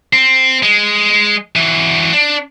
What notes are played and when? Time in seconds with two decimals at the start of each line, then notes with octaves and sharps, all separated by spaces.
0.13 C4
0.63 G#3
1.56 E3 F#3
2.13 D4